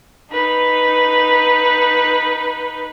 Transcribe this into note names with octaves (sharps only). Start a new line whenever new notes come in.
D#4 B4